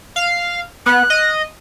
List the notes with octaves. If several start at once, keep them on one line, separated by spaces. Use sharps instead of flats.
F5
B3 F#6
D#5